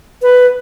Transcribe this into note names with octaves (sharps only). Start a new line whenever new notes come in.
B4